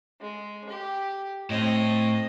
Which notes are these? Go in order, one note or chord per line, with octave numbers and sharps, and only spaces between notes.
G#3
G4
A2 C4 D#5